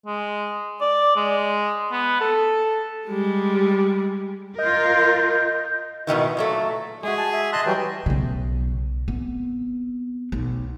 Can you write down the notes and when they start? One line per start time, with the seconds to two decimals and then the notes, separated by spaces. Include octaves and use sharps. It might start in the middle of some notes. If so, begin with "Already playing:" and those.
0.06 G#3
0.81 D5
1.16 G#3
1.91 B3
2.21 A4
3.07 G3 G#3
4.58 F4 A#4 D#5 G6
6.07 G#2 B2 D#3 E3
6.37 A#2 F#3 A3
7.03 G#3 F#4 G#4 E5
7.17 A5
7.32 E5
7.53 D#5 A5 C6 F#6
7.66 E3 F#3 G3 G5
8.06 B1 C#3
9.08 B3 C4
10.32 B1